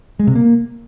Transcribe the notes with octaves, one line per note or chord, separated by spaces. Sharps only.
G#3
C3
A#3